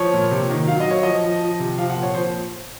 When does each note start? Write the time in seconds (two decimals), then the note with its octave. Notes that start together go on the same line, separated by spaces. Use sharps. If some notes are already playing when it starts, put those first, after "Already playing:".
Already playing: F3 C#5
0.14 A#2
0.31 C3
0.50 D#3
0.67 F#3 F5
0.80 D#5
0.87 F#3 C#5
1.03 F3 D#5
1.24 F3
1.41 F3
1.60 C3
1.77 F3 F5
1.90 F#5
1.96 A#2
2.03 C#5
2.14 F3 C5